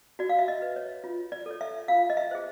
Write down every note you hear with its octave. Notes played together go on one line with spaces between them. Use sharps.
F#4 D5
F5
E5
D#5
B4
C#5
F4
D5
A4 C#5
E5
F4 F5
D#5
E5
G#4 C5